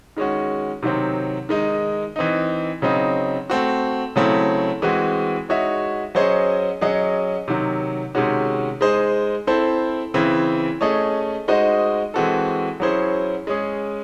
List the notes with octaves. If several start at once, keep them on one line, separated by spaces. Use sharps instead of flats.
D#3 G#3 C#4 F#4
C3 D#3 F#3 C4
D#3 G#3 D#4
E3 C4 D#4
C#3 F#3 C4 D#4
A3 C4 F#4
C#3 F#3 A3 C4 E4
E3 G#3 C4 F#4
G#3 D#4 F#4 C#5 E5
F#3 C#4 G#4 C5 D#5
F#3 C#4 G#4 D#5
C3 D#3 F#3
C3 D#3 G#3 C#4 F#4
G#3 D#4 G#4 C5
C4 E4 A4 C5
C#3 E3 C4 E4
A3 C#4 G#4 D#5
G#3 D#4 F#4 C5 D#5
E3 G#3 C4 F#4 A4
F#3 C#4 E4 G#4 C5
G#3 C#4 G#4